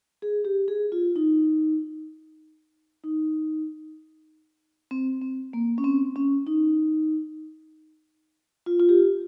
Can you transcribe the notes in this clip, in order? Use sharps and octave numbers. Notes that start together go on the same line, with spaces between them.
G#4
G4
G#4
F4
D#4
D#4
C4
C4
A#3
C#4
C4
C#4
D#4
F4
F4
G4